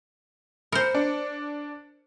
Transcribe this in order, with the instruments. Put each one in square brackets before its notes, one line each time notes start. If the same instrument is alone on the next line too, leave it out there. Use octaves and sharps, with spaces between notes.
[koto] A#4 C5 [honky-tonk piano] B5 C#7
[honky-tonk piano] D4